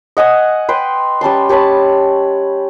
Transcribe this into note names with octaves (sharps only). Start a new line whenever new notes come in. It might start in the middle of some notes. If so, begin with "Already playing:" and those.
D#5 F#5 G#5 D#6
B4 G5 C6
G3 C#4 A5 C6
G4 C#5 A5 B5